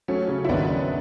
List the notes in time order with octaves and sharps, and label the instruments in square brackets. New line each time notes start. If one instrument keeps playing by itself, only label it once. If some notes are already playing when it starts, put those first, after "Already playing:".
[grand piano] F#3 [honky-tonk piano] A3 C#4
[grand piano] C#3
[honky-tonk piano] E4
[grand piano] G#1 [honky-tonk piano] B3 D4
[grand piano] F#2